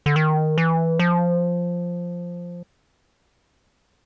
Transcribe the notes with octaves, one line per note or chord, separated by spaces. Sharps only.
D3
D#3
E3
F3